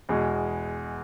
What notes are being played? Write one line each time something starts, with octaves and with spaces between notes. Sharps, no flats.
E2 B2 G#3